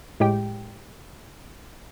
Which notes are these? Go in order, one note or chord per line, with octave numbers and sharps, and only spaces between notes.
A2 G#3 G4 G5